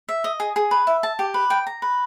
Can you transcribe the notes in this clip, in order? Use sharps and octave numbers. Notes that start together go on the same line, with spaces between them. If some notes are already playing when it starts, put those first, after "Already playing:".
E5
D#5
G#4
G#4
B4
E5
A5
G4
B4
G5
A#5
B4